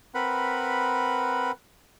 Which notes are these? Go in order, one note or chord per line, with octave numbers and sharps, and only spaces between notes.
C4 A#4 B4 F#5 B5